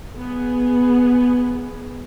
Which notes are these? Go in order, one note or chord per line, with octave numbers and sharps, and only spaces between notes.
B3 G#4